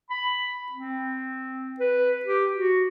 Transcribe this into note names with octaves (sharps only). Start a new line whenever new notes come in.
B5
C4
B4
G4
F#4